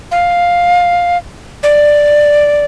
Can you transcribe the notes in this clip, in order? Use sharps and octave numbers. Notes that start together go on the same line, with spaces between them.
F5
D5